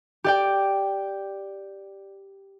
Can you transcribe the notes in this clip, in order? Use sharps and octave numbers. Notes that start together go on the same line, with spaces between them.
G4 D5 G5